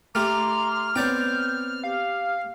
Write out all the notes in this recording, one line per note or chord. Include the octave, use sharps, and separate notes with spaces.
A3 G4 A#5 C6 D6 F6
B3 C4 C#5 D5 G5 G6
G4 F5